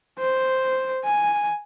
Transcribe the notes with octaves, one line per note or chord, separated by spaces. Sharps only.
C5
G#5